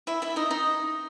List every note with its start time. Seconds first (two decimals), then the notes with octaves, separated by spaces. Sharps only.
0.07 E4 E5
0.22 E4 E5
0.36 D#4 D#5
0.51 D#4 D#5